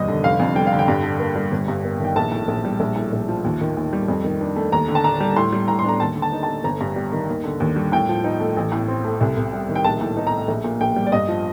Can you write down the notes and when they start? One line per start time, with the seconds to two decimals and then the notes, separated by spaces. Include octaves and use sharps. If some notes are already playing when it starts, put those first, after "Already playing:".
Already playing: F1 D#2 G3 D#5
0.08 D3
0.24 F1 F5
0.40 F2
0.55 G3 G5
0.67 F5
0.72 D3
0.79 G5
0.88 G2
1.04 D3
1.20 A#3
1.36 G3
1.52 G1
1.68 G2
1.85 A#3
2.00 D#3 G5
2.16 A#1 A5
2.32 A2
2.48 A#1
2.65 G3
2.80 A#1
2.96 A2
3.13 A#1
3.28 F3
3.44 D#2
3.61 D#3
3.77 D#2
3.93 G3
4.08 F2
4.24 D#3
4.41 D4
4.56 A3
4.72 D#2 A#5
4.88 D3
4.95 A5
5.04 D4 A#5
5.20 G3
5.36 A2 C6
5.53 G3
5.68 A2 A#5
5.79 C6
5.84 D4 A#5
6.00 D#2 A5
6.16 D3
6.22 A5
6.32 D#4
6.43 A5
6.48 A3
6.64 G1 A#5
6.81 G2
6.96 G3
7.12 D#3
7.29 D#2
7.44 D3
7.60 D#2
7.76 G3
7.92 A2 G5
8.09 F3
8.24 D#4
8.40 A3
8.57 A1
8.72 A2
8.88 C4
9.04 A3
9.21 C2
9.37 C3
9.53 G3
9.69 D#3
9.76 G5
9.84 A#1 A5
10.01 A2
10.17 D#4
10.27 A#5
10.33 A3
10.48 A#1
10.64 A#2
10.81 A#1 G5
10.96 G3
11.06 D5
11.12 G2 D#5
11.28 F3